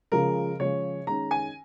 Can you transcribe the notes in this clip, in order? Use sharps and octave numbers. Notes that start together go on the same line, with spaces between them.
C#3 F3 G#3 A#4
C#3 F3 G#3 C#5
D#3 G#3 C#4 A#5
G#5